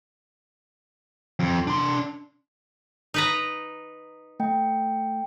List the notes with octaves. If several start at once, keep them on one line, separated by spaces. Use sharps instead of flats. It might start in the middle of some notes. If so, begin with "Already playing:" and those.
F2
D4 C6
D#4 B4 A#5
A3 G5